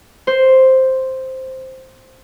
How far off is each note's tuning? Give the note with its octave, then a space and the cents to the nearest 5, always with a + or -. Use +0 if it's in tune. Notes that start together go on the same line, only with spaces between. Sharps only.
C5 +0